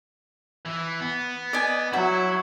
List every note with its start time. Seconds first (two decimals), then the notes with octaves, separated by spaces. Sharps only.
0.66 E3
1.01 B3
1.53 D5 D#5 G#5
1.93 F#3 E4 F#4